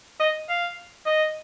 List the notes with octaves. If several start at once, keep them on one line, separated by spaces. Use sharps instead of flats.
D#5
F5
D#5